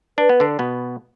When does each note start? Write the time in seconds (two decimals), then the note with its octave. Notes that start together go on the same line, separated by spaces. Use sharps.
0.18 D4 B4
0.29 B3
0.40 D3 D4
0.59 B2 B3